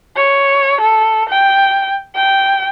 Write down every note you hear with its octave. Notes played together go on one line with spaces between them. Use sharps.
C#5
A4
G5
G5